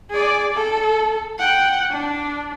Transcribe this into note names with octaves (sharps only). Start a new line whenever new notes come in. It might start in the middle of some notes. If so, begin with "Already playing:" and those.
G#4 D5
A4
F#5 G5
D4